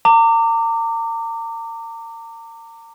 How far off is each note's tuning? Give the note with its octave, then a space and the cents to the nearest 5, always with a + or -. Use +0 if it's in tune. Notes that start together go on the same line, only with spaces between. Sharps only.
A#5 -35 D6 +0